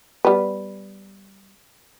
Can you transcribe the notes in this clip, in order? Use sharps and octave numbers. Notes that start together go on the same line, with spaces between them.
G3 B3 B4